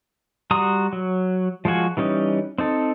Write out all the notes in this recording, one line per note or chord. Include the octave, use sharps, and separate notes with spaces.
G3 F#4 A#5 C6 D#6
F#3
F3 G#3 F4 F#4 G#5
E3 G3 C#4 D#4
C4 D#4 A4